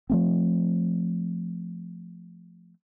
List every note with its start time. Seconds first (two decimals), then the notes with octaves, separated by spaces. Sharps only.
0.10 F3 A3 C4